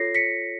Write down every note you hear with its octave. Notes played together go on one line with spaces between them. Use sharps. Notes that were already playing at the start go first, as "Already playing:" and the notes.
Already playing: F4 A4 C#5 A#6 C7
B6 C#7